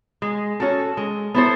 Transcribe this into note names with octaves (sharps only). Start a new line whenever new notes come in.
G#3
C#4 F#4 A4
G#3
B3 E4 A4 C5